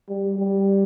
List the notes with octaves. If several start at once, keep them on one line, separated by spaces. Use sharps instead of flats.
G3
G3